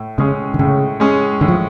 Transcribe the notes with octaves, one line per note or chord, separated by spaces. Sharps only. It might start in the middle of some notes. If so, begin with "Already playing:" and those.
Already playing: A2
C#3 G#3 C#4 G#4
D3
A2 C#3
G#3 C#4 G#4
A2 D3
F3